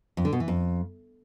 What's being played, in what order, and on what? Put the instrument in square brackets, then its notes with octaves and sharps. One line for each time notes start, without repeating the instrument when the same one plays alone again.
[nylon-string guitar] F2
D3
B2
E3
F2